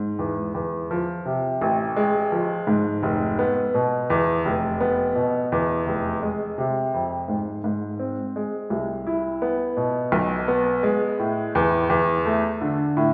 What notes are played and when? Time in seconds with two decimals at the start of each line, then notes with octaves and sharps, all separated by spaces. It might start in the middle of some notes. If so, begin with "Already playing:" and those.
Already playing: G#2
0.19 E2
0.55 E2
0.91 F3
1.26 C3
1.62 A1
1.96 G#3
2.32 F3
2.67 G#2
3.03 F1
3.39 B3
3.74 B2
4.10 E2
4.45 F1
4.81 B3
5.15 B2
5.52 E2
5.87 F1
6.22 G#3
6.58 C3
6.94 F2
7.28 G#2
7.64 G#2
7.99 C4
8.36 G#3
8.70 C2
9.07 E4
9.42 B3
9.77 B2
10.12 B1
10.48 B3
10.83 G#3
11.19 A2
11.55 E2
11.90 E2
12.25 A3
12.61 D3
12.97 A2